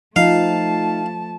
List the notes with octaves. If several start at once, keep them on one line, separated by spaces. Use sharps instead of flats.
F3 A3 D#4 F5 A5